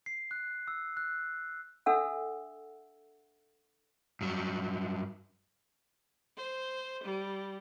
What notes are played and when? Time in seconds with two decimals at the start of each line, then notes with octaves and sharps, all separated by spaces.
0.06 C7
0.31 F#6
0.68 E6
0.97 F#6
1.86 D4 A4 E5 F#5 E6
4.21 G2 F#3
6.36 C5
7.03 G3